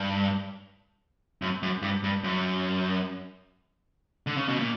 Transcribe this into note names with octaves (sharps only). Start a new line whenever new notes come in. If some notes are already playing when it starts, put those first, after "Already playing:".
Already playing: G2
F#2
F#2
G2
G2
F#2
D3
C#3
B2
A#2